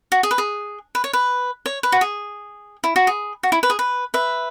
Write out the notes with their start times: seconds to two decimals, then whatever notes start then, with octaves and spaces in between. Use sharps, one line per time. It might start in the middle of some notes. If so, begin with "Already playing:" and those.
0.12 F#4
0.23 G#4
0.31 B4
0.38 G#4
0.95 B4
1.04 C#5
1.13 B4
1.66 C#5
1.83 B4
1.92 F#4
2.01 G#4
2.84 E4
2.96 F#4
3.07 G#4
3.43 F#4
3.52 E4
3.63 B4
3.70 G#4
3.79 B4
4.14 B4 E5